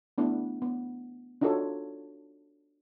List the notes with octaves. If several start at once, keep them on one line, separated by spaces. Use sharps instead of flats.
A3 B3 D4 E4
B3
D4 D#4 F4 F#4 A4 C#5